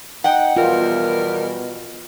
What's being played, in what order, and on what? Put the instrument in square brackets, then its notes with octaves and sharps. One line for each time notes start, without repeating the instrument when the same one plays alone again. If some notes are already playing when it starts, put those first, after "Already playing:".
[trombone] D#4 [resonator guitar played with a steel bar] F#5 G5
[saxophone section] E2 G3 A#4 [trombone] B2 [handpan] F4